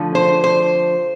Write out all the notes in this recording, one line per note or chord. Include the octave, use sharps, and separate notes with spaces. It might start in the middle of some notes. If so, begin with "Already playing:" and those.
Already playing: D3 F3 A3
C5
C5